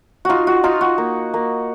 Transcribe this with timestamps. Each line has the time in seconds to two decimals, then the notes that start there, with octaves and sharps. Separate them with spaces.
0.25 D#4 F4 F#4
0.47 F#4
0.64 D#4 F4
0.81 F#4
0.98 A#3
1.34 A#3